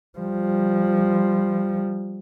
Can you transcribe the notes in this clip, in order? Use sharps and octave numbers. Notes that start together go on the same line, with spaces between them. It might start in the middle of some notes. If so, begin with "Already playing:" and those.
F3 G3